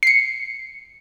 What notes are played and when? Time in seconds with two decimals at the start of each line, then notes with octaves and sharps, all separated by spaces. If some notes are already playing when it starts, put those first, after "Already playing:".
0.03 C7 C#7